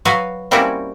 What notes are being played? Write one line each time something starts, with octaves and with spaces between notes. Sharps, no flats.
F#3 F#4 B4 F5
G3 A#3 C4 C#4 E4 F#4